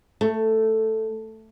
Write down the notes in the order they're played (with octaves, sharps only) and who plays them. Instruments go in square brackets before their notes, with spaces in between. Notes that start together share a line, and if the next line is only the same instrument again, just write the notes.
[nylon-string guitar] A3